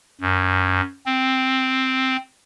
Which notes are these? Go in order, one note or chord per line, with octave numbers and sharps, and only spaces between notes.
F#2
C4